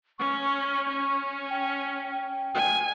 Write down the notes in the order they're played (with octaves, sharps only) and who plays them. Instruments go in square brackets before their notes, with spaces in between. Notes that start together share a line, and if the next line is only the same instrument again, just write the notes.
[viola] C#4 [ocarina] C#6
[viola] C#4
[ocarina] G5
[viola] G#5